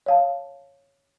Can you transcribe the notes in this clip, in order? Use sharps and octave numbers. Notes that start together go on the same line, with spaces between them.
C#5 F5 A5